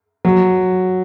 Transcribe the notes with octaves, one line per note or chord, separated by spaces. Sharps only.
F#3